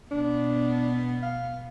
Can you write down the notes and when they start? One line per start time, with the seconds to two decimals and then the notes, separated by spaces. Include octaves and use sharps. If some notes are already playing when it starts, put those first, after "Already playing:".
0.11 B2 B3 D4
1.23 F5